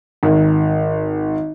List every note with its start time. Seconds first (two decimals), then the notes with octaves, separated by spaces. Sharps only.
0.23 G#1